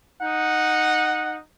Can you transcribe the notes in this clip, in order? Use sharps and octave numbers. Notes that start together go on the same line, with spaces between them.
D#4 F#5